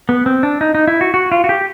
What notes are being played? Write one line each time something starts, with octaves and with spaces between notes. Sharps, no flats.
B3
C4
D4
D#4
D#4
E4
F#4
F#4
F4
F#4
G4